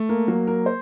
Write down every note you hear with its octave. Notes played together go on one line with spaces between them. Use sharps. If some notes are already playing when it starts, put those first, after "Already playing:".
Already playing: A3
A#3 A#4
F#3 A#3 A#4
A#3 A#4
C5